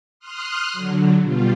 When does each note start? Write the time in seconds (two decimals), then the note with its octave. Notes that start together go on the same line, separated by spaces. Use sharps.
0.19 C6 D#6 F6 F#6
0.73 D3 F#3
1.21 B2 G3 F4